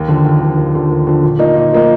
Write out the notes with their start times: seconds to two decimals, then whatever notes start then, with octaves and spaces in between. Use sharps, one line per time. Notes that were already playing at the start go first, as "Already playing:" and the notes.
Already playing: D#2
0.08 D3 F3
0.25 D#2
0.41 D3 F3
0.57 D#2
0.74 D3 F3
0.91 D#2
1.07 D3 F3
1.23 A#2
1.39 F3 A#3 D#4
1.55 A#2
1.73 F3 A#3 D#4